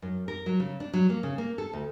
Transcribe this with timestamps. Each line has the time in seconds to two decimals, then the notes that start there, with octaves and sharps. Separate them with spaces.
0.02 F#2
0.28 A#4
0.46 F#3
0.60 C#3
0.80 D4
0.93 F#3
1.10 A#3
1.23 C#3
1.38 A#3
1.58 A4
1.73 D2